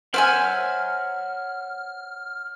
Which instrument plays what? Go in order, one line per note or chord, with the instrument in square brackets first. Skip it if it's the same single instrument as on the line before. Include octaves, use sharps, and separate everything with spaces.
[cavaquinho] C5 E5 G#5 [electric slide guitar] C#5 F#5 [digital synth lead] F6